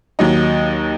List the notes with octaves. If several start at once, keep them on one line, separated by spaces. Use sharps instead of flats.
D#2 F#3 D#4